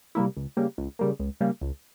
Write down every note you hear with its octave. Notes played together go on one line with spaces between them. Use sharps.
C3 G3 A#3 E4
C#2
C#3 G3 A#3
C#2
C#3 G3 A#3
C#2
C#3 G3 A#3
C#2